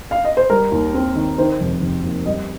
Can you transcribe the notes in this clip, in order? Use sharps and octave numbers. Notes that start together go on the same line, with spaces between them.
F5
D#5
C5
G3 A#4
D#2
C4
D#3
D#3 C5
F1
F1
D#2
G3 D#5